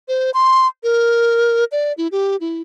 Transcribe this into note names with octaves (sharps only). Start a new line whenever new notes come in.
C5
C6
A#4
D5
E4
G4
E4